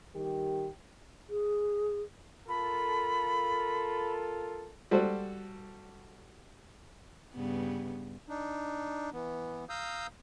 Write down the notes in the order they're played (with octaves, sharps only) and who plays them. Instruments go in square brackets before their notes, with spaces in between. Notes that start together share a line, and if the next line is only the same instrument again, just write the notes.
[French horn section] D#3 G3 G4
[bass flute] G#4
[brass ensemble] F4 A4 A#4 [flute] B5
[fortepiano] G3 F#4 A4 C5
[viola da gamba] G2 C#3 B3
[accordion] D4 D#4
E3 B3
F5 A#5 D#6 E6 G6